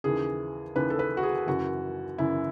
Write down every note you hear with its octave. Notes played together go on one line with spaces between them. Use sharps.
D#2 C#3 E3 G#4
D#2 C#3 E3 B4
A4
B4
F#4
G#4
F#2 C#3 E3 F#4
F#2 C#3 E3 E4